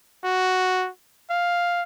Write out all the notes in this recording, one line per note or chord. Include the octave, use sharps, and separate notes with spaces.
F#4
F5